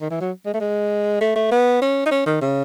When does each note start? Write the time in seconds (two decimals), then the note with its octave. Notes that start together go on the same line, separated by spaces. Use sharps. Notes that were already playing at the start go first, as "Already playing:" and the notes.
0.01 D#3
0.11 E3
0.21 F#3
0.46 G#3
0.54 A3
0.61 G#3
1.21 A3
1.36 A3
1.52 B3
1.82 C#4
2.06 D#4
2.11 C#4
2.26 D#3
2.41 C#3